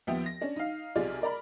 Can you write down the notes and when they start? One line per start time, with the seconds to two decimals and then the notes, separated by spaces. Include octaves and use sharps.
0.07 D#2 F3 B3 E5 G5
0.26 A#6
0.41 C#4 D4
0.56 D#4 F5
0.95 B1 C3 F4 G#4 D5 F6
1.22 A#4 D5 A#5 B5